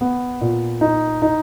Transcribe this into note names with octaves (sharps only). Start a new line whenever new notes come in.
B3
A#2
D#4
D#4